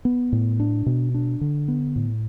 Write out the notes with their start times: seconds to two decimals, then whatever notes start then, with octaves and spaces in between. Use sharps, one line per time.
0.05 B3
0.32 A2
0.60 D4
0.86 B2
1.14 D4
1.41 D3
1.68 B3
1.96 A2